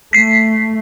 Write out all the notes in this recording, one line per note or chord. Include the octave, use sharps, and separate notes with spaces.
A3 B6 C7